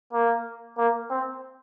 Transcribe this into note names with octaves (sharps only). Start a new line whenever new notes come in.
A#3
A#3
C4